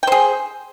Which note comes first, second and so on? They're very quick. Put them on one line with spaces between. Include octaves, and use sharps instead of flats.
G5 C5 G#4